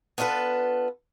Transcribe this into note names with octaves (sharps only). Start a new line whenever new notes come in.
B3 D4 F4 A4 B4